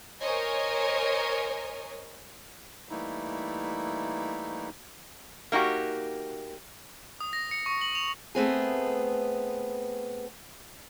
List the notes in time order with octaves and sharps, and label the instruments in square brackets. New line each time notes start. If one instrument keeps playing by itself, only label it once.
[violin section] A#4 C5 C#5 D#5 G#5
[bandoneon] E3 G3 A3 A#3 D#4 E4
[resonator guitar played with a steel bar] A#3 D#4 F#4 G4
[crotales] D#6
A#6
C#7
C#6
F#7
F7
[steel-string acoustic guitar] A3 B3 C4 G#4